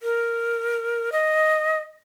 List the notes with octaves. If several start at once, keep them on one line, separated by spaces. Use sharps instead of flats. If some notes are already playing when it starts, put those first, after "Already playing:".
A#4
D#5